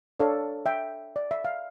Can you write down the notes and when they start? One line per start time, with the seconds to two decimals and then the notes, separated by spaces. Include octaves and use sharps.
0.20 D4 A4 C#5 D5 F5
0.66 E5 G5
1.16 D5
1.31 E5
1.45 F5